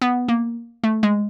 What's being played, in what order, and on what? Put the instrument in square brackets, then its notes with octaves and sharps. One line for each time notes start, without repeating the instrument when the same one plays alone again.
[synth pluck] B3
A#3
A3
G#3